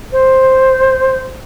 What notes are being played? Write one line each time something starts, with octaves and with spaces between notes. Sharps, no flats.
C5